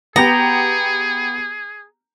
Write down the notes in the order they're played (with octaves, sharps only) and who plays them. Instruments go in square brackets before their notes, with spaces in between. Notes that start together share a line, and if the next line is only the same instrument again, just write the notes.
[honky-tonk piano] B3 G4 [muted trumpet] G#4 [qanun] A#5